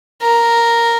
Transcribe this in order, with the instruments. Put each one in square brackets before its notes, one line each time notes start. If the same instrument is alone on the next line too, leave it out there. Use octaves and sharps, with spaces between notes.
[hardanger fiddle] A#4